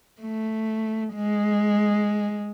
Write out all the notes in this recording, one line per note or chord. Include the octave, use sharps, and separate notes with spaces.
A3
G#3